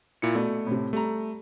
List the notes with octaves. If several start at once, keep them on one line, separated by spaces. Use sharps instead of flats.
A#2 E4 C#7
B2 A3 D5
A2 C3
G3 A3 A#5